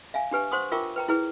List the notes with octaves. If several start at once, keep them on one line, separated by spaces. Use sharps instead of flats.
E5 F5 G#5
D4 G4 B4 G#5
C5 F#5 C6 C#6 D#6
F4 A#4 E5 G5 C#6 D6
B4 G5 A#5
E4 G#4 B4